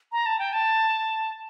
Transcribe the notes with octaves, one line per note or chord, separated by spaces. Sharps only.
A#5
A5
G5
A5